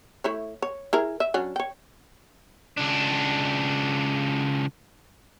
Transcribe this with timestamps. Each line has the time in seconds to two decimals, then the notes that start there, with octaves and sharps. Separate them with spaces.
0.24 A3 E4 C#5
0.62 C#5
0.93 E4 G#4 A#4
1.20 E5
1.34 F#3 C#4 D4
1.56 C#5 G5
2.77 C#2 D4